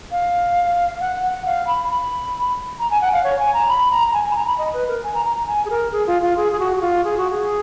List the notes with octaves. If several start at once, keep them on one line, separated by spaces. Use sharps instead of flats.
F5
F#5
F#5
F5
B5
B5
A#5
G#5
F#5
F5
C#5
G#5
A#5
B5
A#5
A#5
G#5
G#5
B5
A#5
B5
D#5
B4
A#4
G#5
A#5
A#5
A#5
G#5
G#4
A#4
G#4
F4
F4
G#4
G#4
F#4
F#4
F4
G#4
F#4
G#4